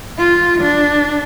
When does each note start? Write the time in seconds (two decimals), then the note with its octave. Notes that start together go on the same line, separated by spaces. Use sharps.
0.18 F4
0.61 D4